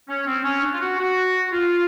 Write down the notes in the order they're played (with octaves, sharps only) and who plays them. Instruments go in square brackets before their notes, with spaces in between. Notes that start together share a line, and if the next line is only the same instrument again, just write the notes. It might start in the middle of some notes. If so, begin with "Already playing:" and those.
[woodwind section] C#4
C4
C#4
D4
F4
F#4
F#4
F4